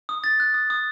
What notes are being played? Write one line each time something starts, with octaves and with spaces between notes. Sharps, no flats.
D#6
A6
F#6
D#6
D#6